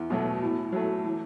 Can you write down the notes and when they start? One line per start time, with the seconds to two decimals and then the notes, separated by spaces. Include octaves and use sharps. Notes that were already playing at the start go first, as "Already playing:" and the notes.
Already playing: E2
0.10 B2 F#3 A3
0.42 A2
0.72 F#3 A3
1.04 E3